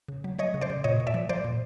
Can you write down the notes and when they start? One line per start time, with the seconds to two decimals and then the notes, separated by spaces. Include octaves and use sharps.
0.08 C#3
0.24 F#3
0.39 F#3 C#5 D#5
0.54 C#3
0.61 C5 D5
0.70 C#3
0.84 A#2 C#5 D#5
1.00 A#2
1.07 D5 E5
1.14 F3
1.29 F3 C5 D5
1.44 A#2